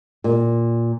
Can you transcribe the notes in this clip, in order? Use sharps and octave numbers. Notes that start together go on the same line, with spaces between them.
A#2